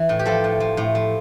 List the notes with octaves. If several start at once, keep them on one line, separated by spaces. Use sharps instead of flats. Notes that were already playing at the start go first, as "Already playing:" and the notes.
Already playing: E3
A2
G4
F3 A4
A2
F3
A2
F3